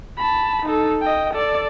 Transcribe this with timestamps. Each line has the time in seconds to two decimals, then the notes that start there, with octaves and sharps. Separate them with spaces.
0.17 A5 B5
0.65 D#4 A4
1.01 D#5 G5
1.34 A4 D5